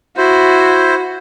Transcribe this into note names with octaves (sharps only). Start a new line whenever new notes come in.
E4 F#4 C5